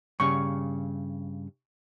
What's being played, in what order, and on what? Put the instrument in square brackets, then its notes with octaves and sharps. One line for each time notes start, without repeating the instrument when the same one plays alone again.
[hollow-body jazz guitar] G2 C#3 [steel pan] C#6